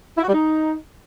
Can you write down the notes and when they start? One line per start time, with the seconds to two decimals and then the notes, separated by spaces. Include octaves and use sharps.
0.18 E4
0.23 F#4
0.28 G3
0.34 D#4